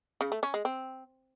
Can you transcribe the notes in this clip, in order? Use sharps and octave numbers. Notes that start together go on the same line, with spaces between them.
C#3
A3
C#4
G#3
C4